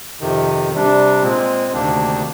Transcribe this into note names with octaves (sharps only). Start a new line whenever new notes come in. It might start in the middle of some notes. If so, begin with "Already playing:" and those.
F2 C3 D#3
C3 G3 D4
A#2 G#3 C4
D2 C3 D#3 A#3 D4